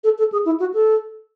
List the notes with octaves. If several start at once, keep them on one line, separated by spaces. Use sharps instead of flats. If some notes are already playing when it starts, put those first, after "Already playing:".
A4
A4
G#4
E4
F#4
A4